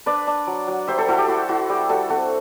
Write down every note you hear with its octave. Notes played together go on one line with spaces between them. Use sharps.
D4 B4 D5
D4
F#3
F#3
G3 C5 E5
A4 C5
E4 F#4 A4
G4
E4 F#4
E4 F#4
G3 G4
G3 F#4 A4
C4 F#4 A4